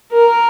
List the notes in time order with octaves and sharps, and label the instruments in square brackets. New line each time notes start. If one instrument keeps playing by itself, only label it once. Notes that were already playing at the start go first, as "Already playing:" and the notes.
[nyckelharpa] A#4